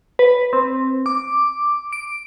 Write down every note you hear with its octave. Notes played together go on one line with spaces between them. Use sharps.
B4
C4
D6
D7